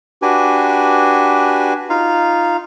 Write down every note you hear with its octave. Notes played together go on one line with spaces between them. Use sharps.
D4 F#4 G4 B4 G#5
D#4 F4 F5